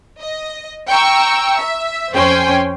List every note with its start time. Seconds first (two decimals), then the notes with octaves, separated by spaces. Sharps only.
0.20 D#5
0.88 G5 A#5 C#6 E6
1.58 E5
2.13 F2 C#4 C5 G5 G#5 C6